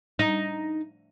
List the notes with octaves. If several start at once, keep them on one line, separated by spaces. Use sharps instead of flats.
D#4